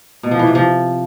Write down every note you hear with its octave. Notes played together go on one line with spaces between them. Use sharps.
B2
F3
E3
C3
F3